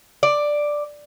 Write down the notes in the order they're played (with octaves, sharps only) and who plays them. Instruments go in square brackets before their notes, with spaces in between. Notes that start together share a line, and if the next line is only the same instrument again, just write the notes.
[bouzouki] D5